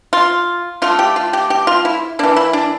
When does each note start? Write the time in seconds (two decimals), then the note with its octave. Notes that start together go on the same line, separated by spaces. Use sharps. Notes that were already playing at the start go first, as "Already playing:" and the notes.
0.13 F4
0.82 D3 A3 F4
0.99 G4
1.16 F4
1.33 G4
1.50 G4
1.67 F4
1.85 E4
2.19 E3 A#3 D4
2.36 E4
2.53 D4